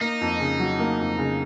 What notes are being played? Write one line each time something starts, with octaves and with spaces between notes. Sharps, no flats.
A#3 D#4
F2
C#3
F#3
A#3
F2
C#3